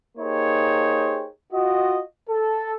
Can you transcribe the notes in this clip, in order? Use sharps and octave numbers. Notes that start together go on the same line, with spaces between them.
A#3 D#4 G4 G#4 C5 C#5
F4 F#4 D#5
A4